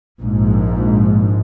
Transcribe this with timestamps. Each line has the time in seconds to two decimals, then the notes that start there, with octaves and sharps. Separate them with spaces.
0.21 A#1 G#2